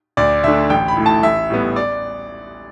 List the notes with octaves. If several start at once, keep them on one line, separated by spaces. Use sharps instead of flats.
D2 D5
D3 A3 D4 E5
A1 G5
B5
A2 A3 E4
A5
A1 E5
A2 G3 B3
D5